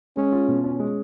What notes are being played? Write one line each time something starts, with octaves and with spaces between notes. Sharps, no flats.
G#3 C#4
F4
B2
C#4
G#3